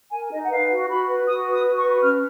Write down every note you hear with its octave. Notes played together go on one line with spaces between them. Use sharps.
A#4 G#5
D#4 D#5
F#5
B4 F5
F#4
F#4 B5
B4
F#4 D#6
B4
D#6
F#4
C#6
B4
C#4 F6